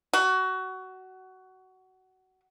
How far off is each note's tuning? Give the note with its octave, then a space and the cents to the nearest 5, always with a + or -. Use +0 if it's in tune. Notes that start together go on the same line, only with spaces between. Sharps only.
F#4 +20